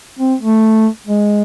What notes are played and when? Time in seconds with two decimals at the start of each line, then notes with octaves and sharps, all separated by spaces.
0.19 C4
0.41 A3
1.07 G#3